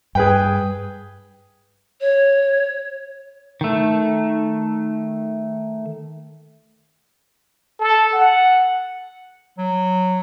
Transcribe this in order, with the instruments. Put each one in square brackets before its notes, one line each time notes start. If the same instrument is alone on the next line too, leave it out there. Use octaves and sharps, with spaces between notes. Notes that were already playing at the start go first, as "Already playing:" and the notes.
[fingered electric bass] G2 [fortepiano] G#4 B4 G5
[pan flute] C#5
[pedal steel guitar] D#3 A3
[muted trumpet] A4
F#5
[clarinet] F#3